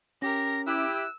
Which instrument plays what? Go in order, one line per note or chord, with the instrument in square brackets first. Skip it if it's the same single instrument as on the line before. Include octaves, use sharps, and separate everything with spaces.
[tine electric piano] C#4 [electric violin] G4 A#4 [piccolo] A#6
[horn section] E4 G4 [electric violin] E6 [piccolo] F#6